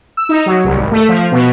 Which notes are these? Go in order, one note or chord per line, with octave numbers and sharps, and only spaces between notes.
E6
D#4
F#3
C2
G#1
A3
F3
B2